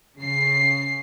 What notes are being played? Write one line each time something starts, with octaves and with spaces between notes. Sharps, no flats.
C#3 C7